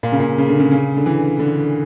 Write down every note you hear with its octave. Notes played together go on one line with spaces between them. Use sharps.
A#2
C#3
A#2
C#3
D3
C#3
C#3
D3
E3
D3